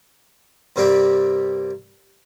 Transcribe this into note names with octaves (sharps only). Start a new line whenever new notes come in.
G2 C3 G3 A#3 C4 G4